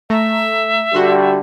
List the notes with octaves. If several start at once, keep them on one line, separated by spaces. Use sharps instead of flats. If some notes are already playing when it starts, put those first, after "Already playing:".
A3 E5 A#5
D3 G3 F#4 C6